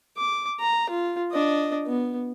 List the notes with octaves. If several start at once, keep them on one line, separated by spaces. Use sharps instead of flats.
D6
A#5
F4
D4 D#5
B3